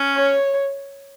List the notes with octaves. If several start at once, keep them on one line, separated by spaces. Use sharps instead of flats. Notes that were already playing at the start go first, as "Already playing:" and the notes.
Already playing: C#4
C#5